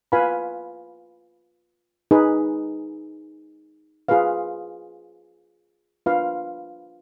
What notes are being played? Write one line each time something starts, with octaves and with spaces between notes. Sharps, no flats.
F4 B4 F5 G#5 B5
D#4 G#4 B4
F4 G#4 B4 F5
D4 F4 B4 F5 B5